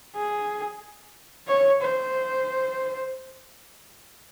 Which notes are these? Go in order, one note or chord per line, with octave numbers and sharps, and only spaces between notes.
G#4
C#5
C5